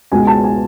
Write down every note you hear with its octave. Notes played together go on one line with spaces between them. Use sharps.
C#2 B2 G#3 G#5
A5
G#5